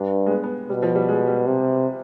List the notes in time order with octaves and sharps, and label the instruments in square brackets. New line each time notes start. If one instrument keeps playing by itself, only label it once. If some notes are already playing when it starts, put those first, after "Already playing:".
Already playing: [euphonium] G2 [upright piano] D4
[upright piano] G#3
B3
B3
[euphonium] B2 [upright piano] G3
[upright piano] F3
G3
G#3
G3
[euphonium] C3